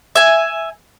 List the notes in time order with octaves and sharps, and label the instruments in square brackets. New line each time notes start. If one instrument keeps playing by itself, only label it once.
[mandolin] E5 G#5